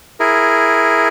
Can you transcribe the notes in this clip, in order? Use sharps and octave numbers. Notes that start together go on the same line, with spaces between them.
E4 G#4 A#4